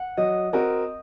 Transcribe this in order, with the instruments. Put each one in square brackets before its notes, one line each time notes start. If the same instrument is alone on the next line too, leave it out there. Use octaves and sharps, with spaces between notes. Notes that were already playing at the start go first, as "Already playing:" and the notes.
Already playing: [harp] F#5
[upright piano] F#3 [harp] D#5
[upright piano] C4 F#4 A#4 [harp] D#5